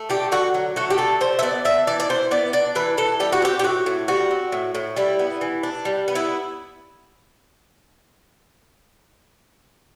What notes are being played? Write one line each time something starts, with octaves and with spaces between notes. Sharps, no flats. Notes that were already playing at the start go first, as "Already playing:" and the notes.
Already playing: A3
D3 G4
D3 F#4
F#3
A3 F#4
G4
D3 A4
D3 C5
E5
B3 D5
D4 E5
E3 D5
D5
E3 C5
B3 D5
D4 D5
E3 B4
E3 A4
G3 G4
F#4
C4 G4
G4
A2 F#4
A2
G3 F#4
C4
A2
A2
G3 E4
B3
E3
D4
G3
B3
E4